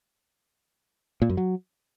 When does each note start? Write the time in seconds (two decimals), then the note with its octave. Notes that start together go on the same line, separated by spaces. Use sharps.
1.22 A#2
1.29 F#2
1.37 F#3